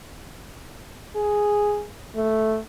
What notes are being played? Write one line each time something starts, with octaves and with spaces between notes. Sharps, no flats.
G#4
A3